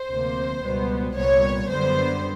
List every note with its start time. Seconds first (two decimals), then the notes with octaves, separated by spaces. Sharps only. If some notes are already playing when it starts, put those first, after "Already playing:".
Already playing: C5
0.11 D2 C3 F3 A#3
0.64 C#2 B2 G3 B3
1.16 C2 A#2 G3 B3 C#5
1.69 F#2 D3 G3 B3 C5